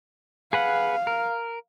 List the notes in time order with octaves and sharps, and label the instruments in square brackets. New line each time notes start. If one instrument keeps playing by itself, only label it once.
[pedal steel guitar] G#4 B4 F#5 [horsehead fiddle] F5
[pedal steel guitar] A#4